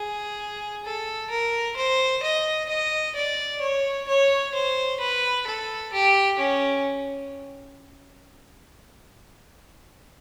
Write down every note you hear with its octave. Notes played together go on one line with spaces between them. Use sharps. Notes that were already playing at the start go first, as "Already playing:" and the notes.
Already playing: G#4
A4
A#4
C5
D#5
D#5
D5
C#5
C#5
C5
B4
A4
G4
C#4